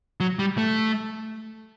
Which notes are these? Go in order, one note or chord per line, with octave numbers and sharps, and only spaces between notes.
F#3
G3
A3